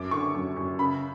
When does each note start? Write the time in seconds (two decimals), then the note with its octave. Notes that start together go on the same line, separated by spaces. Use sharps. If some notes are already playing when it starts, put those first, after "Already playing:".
Already playing: F#2 D6
0.11 D3 C#6
0.35 F#2
0.56 F#2
0.79 C#3 B5